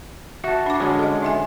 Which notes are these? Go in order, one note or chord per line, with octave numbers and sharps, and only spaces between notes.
F#4 E5 A5
D4 D6
D3 G#3 C#4 D4 F#4
A4 D#5
D#4 E5 G#5